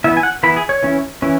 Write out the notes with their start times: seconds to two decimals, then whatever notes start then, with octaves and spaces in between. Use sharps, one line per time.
0.04 E3 B3 E4 E5
0.17 G#5
0.23 F#5
0.43 E3 B3 E4 B5
0.57 G#4
0.69 C#5
0.83 E3 C#4 E4
1.22 E3 C#4 E4